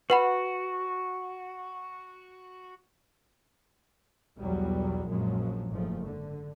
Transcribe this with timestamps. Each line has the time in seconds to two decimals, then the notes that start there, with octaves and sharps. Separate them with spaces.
0.10 F#4 B4 F#5 B5
4.38 B1 E2 F#3 G3
5.08 A#1 F#2 A#2 F3 F#3 G#3
5.71 F#1 G#2 F3 A3
6.05 D3